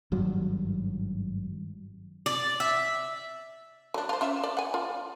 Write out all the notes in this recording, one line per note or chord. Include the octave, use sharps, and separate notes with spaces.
G#1 G2 F#3
D5
E5
F#3 D4
F4 C5
C#4 F4 E5
D5
F#5 G#5
F4